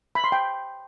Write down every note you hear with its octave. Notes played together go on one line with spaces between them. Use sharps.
B5
C6
G5